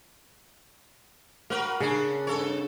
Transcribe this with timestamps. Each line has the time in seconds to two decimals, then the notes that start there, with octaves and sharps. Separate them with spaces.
1.50 A#3 F#4 A#4 B4
1.80 C#3 C#4 D4
2.27 G2 A4 C#5